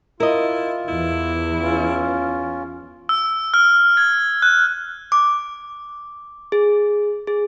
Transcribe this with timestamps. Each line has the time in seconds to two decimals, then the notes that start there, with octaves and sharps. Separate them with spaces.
0.20 E4 F4 A#4 D#5
0.88 E2 E3 E4
1.60 C#4 F4
3.09 E6
3.54 F6
3.97 G#6
4.42 F#6
5.12 D6
6.52 G#4
7.27 G#4